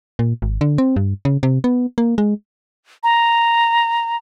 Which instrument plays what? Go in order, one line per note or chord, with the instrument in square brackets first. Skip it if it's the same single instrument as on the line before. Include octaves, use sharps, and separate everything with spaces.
[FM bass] A#2
G#1
D3
C4
G2
C#3
C3
B3
A#3
G#3
[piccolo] A#5